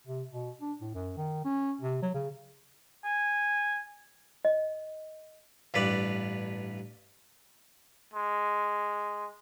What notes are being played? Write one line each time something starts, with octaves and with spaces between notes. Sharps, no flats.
C3
B2
D4
A2
F#2
D#3
C#4
C3
F#3
C#3
G#5
D#5
A1 G2 B4 D5
G#3